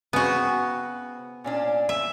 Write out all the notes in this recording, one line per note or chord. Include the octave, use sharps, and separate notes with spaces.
C#3 B3 C4 F#4
A#2 C#4 D4
E5